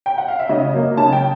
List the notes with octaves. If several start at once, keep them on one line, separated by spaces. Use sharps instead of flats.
G5
F#5
F5
E5
C#3 D#5
F#3 A#3
C#3 A5
G5